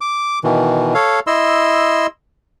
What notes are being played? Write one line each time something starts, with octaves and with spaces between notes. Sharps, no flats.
D6
B2 D#3 E3
A4 C#5 F5
E4 D#5 C6 E6